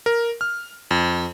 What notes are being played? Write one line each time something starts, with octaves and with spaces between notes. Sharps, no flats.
A#4
F6
F2